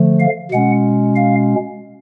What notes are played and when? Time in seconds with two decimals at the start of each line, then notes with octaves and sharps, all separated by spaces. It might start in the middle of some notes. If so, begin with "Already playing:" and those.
Already playing: D3 F3 A3
0.20 F5
0.51 B2 G#3 C#4 F#5
1.16 F5